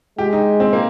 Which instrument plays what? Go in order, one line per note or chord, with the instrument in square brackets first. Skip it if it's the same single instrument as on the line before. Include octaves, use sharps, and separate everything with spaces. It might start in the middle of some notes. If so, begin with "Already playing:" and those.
[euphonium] G#3 [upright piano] G4
[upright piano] D#4
C4
A#3